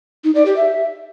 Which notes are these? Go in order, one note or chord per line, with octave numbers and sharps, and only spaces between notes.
D#4
D5
G4
E5